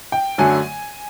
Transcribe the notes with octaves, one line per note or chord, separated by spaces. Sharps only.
G5
F#2 D3 F#3 A3 G#5